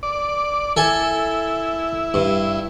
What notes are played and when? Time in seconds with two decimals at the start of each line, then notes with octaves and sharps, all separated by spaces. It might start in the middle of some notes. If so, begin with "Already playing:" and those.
0.03 D5
0.76 E4 A4 G#5
2.14 G2